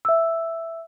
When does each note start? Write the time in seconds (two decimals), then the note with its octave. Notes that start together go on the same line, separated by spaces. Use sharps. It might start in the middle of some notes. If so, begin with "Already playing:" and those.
0.05 E5 E6